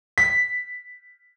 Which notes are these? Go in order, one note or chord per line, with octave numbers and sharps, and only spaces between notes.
B6